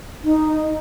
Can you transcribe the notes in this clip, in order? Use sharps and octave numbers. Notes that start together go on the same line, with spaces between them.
D#4